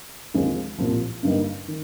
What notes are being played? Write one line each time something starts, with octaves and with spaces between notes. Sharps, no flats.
D#2 D3 F3 G#3 C4
C2 A#2 F3
G2 D3 G3 A#3 D#4
D#3